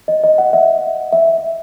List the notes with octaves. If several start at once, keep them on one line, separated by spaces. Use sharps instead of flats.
D#5
D#5
F#5
E5
E5